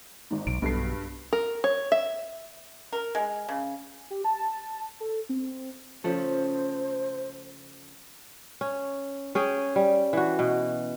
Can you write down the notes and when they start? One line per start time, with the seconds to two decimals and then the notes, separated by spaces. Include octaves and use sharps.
0.31 G#1 G#2
0.47 B1 D7
0.62 B1 G2 B2 A4 C7
1.33 A#4
1.64 C#5
1.92 E5
2.93 A#4
3.15 G#3
3.49 C#3
4.10 G4
4.24 A5
5.00 A4
5.29 C4
6.04 C#3 F3 A3 C5
8.61 C#4
9.35 C#4 G#4 G5
9.76 G3
10.13 E3 F#4
10.39 B2